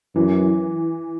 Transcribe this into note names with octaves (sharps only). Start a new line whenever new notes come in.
F#2 E3